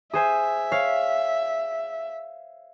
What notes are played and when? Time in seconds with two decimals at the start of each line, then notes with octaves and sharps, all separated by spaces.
0.13 G#4 C5 E5 G#5
0.72 C#5 F5